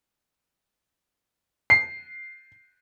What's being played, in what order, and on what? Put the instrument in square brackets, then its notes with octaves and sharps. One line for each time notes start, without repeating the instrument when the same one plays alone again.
[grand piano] C7